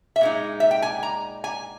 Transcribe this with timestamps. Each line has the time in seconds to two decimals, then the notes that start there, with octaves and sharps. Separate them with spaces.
0.16 E5
0.21 A#2 G#3 D#4
0.60 E5
0.71 G5
0.82 G#5
1.03 A#5
1.44 G#5